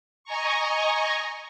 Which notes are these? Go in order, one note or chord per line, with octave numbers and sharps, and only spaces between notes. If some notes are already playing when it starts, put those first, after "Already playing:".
D#5 G#5 A#5 C#6